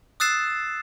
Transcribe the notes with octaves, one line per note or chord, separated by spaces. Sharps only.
D#6 E6 F#6 A6 C7 E7